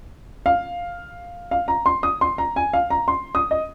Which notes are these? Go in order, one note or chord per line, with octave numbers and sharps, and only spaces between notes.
F5
F5
A#5
C6
D#6
C6
A#5
G#5
F5
A#5
C6
D#6
D#5